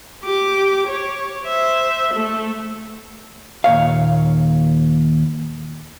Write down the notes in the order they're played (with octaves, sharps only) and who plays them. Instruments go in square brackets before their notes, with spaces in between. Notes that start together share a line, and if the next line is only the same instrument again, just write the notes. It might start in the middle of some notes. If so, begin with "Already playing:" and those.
[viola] G4 D6
C#5
C5 E5
A3 A4
[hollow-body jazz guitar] D#2 A#2 C#5 F5